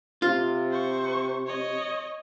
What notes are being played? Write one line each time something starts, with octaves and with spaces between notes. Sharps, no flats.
C3 F4
C5 C#6
C#5 D#5